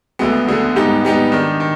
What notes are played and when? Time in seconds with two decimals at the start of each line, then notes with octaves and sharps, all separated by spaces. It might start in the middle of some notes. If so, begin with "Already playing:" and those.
0.19 D2 D3 G#3 B3
0.47 D2 D3 G#3 B3
0.76 G#2 G3 B3 D#4 G4
1.03 G#2 G3 B3 D#4 G4
1.32 D#3 G#3 D4
1.60 D#3